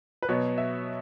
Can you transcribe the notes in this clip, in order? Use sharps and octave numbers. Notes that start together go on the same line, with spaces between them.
B4
B2 F#3 B3 C#5
E5